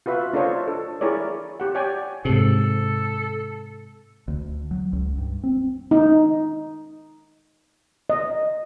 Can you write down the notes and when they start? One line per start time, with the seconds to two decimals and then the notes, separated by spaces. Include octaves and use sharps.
0.06 F4 F#4 B4 E5
0.33 D4 F4 A4 C5 C#5 D#5
0.68 A4
1.01 E4 G#4 A#4 C#5 D5
1.60 G4 F#5
1.74 G4 C#5 D5 G5 G#5
2.25 G#2 C3 A4
4.28 D2
4.71 F#3
4.93 C#2
5.18 G2
5.44 C4
5.91 D#4
8.10 D#5